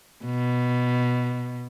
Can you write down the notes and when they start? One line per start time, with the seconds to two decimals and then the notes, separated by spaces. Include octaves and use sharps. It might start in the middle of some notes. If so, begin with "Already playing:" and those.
0.25 B2